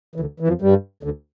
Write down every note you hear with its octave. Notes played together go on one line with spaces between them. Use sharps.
E3
D2 D3
E3
F2 F3
G2 G3
D2 D3